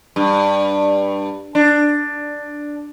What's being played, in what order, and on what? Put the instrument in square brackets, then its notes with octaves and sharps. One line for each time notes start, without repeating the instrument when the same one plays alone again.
[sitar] G2
D4